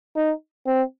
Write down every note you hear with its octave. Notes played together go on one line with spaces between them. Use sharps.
D#4
C4